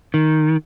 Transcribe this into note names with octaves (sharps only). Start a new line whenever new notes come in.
D#3